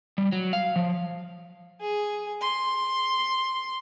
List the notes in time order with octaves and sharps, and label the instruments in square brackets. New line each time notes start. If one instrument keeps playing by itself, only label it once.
[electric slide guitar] G3
F#3
F5
F3
[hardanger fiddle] G#4
C6